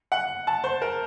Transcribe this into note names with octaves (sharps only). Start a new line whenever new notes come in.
F#5
A5
C5
A#4